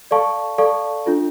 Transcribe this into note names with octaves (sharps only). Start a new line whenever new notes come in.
A4 D5 F5 A5 C#6
A4 D5 F5 A5 C#6
D4 F4 A4